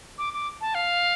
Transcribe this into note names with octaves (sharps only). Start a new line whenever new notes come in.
D6
D6
A5
F5